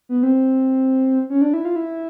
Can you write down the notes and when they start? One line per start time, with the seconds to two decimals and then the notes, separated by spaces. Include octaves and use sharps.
0.09 B3
0.23 C4
1.30 C#4
1.41 D4
1.54 E4
1.65 F4
1.76 E4